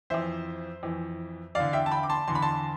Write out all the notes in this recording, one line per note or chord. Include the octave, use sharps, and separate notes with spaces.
F2 E3 C5 E5
F2 E3
E2 D3 D5 F5
E5 G5
A5
G5 B5
D6
A5 C6
E2 D3 C6
B5
A5 C6